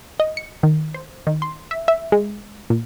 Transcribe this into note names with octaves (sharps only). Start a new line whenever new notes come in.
D#5
C#7
D#3
C5
D#3
C6
E5
E5
G#3
A#2